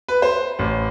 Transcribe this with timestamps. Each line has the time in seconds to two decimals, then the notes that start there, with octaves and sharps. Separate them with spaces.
0.08 B4
0.22 C5
0.59 A1